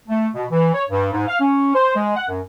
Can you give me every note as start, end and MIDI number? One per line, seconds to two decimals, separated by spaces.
0.08 0.29 57
0.35 0.46 47
0.51 0.73 52
0.74 0.83 73
0.89 1.09 43
1.12 1.26 44
1.28 1.38 77
1.40 1.73 61
1.75 1.93 72
1.96 2.15 56
2.16 2.26 78
2.29 2.40 42